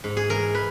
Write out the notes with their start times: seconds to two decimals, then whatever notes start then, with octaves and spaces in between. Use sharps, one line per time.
0.04 G#2
0.17 G#4
0.29 E3 A#4
0.55 B4